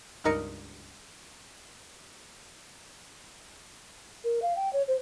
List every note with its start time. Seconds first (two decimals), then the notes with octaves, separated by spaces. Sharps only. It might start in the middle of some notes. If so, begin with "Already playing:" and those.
0.24 C#2 G2 D#4 A#4 D#5 C#7
4.24 A#4
4.42 F5
4.56 G5
4.73 C#5
4.88 C5